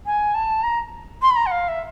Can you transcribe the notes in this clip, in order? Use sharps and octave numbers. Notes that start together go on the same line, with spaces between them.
G#5
A5
A#5
C6
B5
A#5
F#5
F5
E5